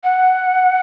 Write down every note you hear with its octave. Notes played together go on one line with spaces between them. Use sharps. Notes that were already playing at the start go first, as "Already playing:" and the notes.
F#5